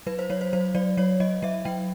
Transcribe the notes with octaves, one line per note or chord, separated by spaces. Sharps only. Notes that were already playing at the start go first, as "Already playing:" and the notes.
F#3 B4
C5
F#3 C#5
C5
F#3 C5
F#3 D5
F#3 C#5
F#3 D#5
F#3 E5
F#3 G5